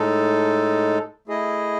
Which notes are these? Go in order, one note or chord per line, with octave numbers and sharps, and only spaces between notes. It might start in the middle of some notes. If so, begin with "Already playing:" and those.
Already playing: A2 G#3 D#4 A4
A3 E4 G#4 D#5